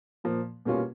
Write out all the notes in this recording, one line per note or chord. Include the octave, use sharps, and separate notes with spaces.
A#2 F3 A#3
B2 G3 A#3 C#4 F4